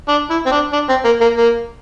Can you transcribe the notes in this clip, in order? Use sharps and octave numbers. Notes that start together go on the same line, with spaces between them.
D4
E4
C4
D4
D4
C4
A#3
A#3
A#3